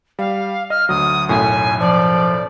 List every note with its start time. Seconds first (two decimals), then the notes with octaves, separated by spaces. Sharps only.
0.19 G3 F5
0.70 D#5 F6
0.89 D2 F#3 D#6
1.29 B1 F#2 A2 G#5
1.80 F3 D5